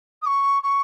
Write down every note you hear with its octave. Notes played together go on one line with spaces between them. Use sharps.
D#6
C#6
C#6